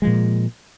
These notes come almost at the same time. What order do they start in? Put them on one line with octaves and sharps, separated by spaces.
G#3 F3 A#2